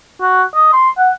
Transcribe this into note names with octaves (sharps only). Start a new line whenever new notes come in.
F#4
D#5
C6
F#5